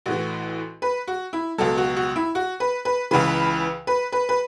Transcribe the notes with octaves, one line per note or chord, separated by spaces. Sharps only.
A1 A2 E3 F#4
B4
F#4
E4
C#2 B2 F#3 A4
F#4
F#4
E4
F#4
B4
B4
C#2 C#3 E3 B4
B4
B4
B4